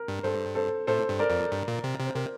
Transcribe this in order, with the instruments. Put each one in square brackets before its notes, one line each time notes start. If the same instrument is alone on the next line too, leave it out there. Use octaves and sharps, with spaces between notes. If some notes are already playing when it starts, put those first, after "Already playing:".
Already playing: [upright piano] A#4
[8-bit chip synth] G2
[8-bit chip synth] G2 [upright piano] A4 C5
[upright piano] A4 C5
[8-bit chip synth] A2 [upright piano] A4 C5
[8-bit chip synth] G2
[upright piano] A#4 D5
[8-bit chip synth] F2
G2
A#2
C3
C3
[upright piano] C5
[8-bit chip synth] C3 [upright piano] A#4